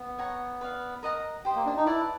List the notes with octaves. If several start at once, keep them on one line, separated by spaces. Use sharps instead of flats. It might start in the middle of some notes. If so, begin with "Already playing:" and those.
Already playing: B3
C#5 F#5 A#5 C#6
B4 D5 F5
A#4 D#5 F#5 A#5
G4 C5 D#5
A#3
D4
D#4
E4 B4 D5 F#5 A5